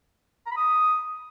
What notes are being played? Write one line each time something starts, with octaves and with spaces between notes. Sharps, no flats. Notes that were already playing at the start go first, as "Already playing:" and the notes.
A#5
B5
D#6